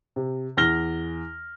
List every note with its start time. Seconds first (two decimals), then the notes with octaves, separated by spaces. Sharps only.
0.16 C3
0.57 E2 F6 A#6 G7